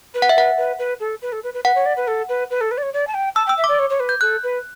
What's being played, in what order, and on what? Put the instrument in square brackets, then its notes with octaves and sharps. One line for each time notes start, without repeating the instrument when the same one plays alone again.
[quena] B4
[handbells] F#5
E5
[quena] B4 [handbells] F#5
[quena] B4
B4
A4
B4
A4
B4
B4
[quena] B4 [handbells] F#5
[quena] C#5
D5
B4
A4
B4
B4
A4
B4
D5
C#5
D5
A5
G5
[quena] A5 [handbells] E6
[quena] G5
[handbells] E6
[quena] E5
[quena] D5 [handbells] D6
[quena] C#5
C#5
B4
[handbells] G6
[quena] A4 [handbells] F#6
[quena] B4